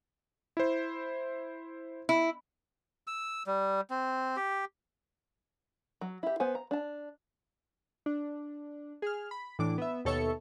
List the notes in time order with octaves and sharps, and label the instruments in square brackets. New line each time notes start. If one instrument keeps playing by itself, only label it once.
[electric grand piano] E4 C5
[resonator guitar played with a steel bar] E4
[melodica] E6
G3
C4
G4
[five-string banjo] F#3
E4 G4
B3 C5 G#5
A#5
D4 A5
[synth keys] D4
G#4 F6
B5
A2 E3 D4 D6
B3 E5
D#2 B2 A4 C#5 E5 C#7